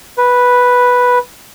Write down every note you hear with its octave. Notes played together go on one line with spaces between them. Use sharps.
B4